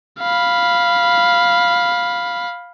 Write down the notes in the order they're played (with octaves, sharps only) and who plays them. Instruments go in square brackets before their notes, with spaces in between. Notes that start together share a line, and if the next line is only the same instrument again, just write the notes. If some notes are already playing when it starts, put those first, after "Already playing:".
[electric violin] F5 B5